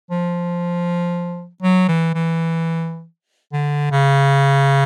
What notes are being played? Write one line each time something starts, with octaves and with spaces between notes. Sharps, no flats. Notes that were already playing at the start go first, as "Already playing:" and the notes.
F3
F#3
E3
E3
D3
C#3